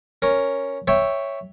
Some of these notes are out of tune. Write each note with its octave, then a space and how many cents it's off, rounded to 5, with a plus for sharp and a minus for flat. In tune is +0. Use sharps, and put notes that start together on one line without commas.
C#4 +0 A#4 +0
C#5 +0 E5 +0 G5 +0